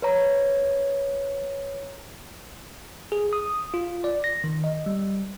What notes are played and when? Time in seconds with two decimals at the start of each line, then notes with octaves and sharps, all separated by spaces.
0.02 B4 C#5 A#5
3.12 G#4
3.33 D#6
3.74 F4
4.04 D5
4.24 A#6
4.44 D#3
4.64 D#5
4.86 G3